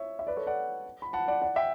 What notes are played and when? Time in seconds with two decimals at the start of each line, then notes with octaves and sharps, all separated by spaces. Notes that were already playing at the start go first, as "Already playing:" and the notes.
Already playing: C#5 E5
0.19 E5
0.27 B4 D5
0.37 A4 C#5
0.47 D5 F#5
1.02 B5
1.13 F#5 A5
1.28 D5 F#5
1.42 D5 F#5
1.56 E5 G5